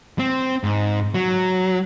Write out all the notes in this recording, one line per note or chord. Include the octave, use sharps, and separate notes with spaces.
C4
G#2
F#3